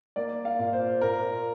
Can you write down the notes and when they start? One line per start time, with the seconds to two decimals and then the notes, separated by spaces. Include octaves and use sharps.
0.16 A#3 D5
0.45 F5
0.59 A#2
0.73 C5
1.01 A#2 A#4